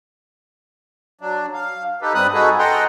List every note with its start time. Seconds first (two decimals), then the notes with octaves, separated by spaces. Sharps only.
1.21 F#3 D4
1.54 F5
2.02 D#4 G4 A4 B4
2.15 G2 G3 C4 B4 D#6 F#6
2.34 D#4 F#4 G#4 A4 B4
2.59 A4 D#5 F#5 G5 A#5 C6